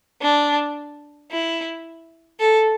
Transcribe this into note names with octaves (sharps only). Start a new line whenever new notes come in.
D4
E4
A4